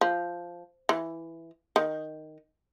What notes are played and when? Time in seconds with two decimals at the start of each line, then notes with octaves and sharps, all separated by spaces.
0.01 F3
0.89 E3
1.76 D#3